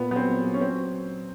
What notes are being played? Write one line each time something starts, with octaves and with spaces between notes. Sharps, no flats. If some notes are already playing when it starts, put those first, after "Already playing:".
Already playing: A#2 B3
F#3 B3
C4
F#3
F#3
C#4
F#3 C4